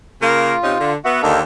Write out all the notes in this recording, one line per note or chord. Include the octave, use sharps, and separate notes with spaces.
C#3 A#3 F4 A#4
C3 C#4 D#4
D3
B3 F#4 E5 F#5
D#2 D3 A#3 D#4 A4